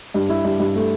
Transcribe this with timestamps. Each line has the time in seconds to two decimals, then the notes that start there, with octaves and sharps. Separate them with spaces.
0.14 G2
0.29 E4
0.44 G2
0.60 G2
0.75 A3